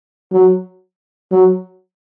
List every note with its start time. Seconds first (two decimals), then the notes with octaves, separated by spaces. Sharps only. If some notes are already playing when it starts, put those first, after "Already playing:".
0.32 F#3
1.32 F#3